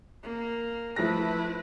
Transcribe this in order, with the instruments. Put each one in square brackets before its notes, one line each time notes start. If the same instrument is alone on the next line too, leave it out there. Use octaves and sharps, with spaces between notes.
[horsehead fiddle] A#3
[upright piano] F3 A3 A#6 [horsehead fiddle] E4 B4